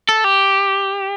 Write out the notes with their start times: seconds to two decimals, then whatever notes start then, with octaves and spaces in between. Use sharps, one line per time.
0.09 A4
0.24 G4